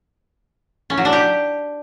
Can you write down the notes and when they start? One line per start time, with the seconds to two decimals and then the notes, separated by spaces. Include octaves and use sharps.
0.90 C#4
0.97 F#3
1.05 D4
1.13 G4